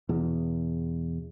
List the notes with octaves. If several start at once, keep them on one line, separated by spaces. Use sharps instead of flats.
E2 B2